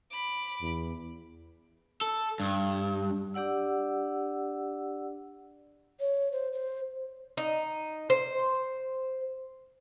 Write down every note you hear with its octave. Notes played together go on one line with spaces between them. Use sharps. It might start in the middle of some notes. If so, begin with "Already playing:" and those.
B5 D6
E2
A4
G2
D4 G4 D5 F#5 E6
C#5
C5
C5
D#4
C5